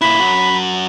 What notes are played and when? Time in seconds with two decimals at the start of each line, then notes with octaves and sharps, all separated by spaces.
0.01 A#2 E4 B5
0.20 F#2 F#4